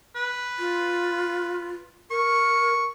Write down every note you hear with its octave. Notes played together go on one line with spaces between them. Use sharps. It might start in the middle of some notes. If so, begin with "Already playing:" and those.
B4
F4
A#4 C#6